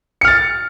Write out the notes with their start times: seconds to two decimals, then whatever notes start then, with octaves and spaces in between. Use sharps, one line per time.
0.21 C#7
0.25 F6
0.28 A6